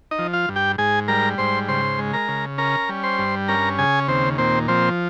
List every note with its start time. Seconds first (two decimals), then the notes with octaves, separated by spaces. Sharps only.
0.11 D#4 D#5
0.19 F3
0.33 F4 F5
0.49 G2
0.56 G4 G5
0.78 G#2 G#4 G#5
1.08 G3 A#4 A#5
1.38 G#2 C5 C6
1.68 C#3 C5 C6
1.99 G#3
2.13 A#4 A#5
2.28 C#3
2.58 C#4 A#4 A#5
2.89 G3
3.03 C5 C6
3.18 G2
3.48 C#4 A#4 A#5
3.79 C#3 G#4 G#5
4.08 D#2 C4 C5
4.38 A#2 C4 C5
4.68 F3 C4 C5